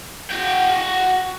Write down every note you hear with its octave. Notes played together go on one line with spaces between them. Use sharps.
F#4 G5